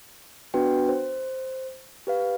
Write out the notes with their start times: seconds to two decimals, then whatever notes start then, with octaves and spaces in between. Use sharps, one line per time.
0.54 B3 D4 F#4 B4 G5
0.89 C5
2.07 G4 B4 F5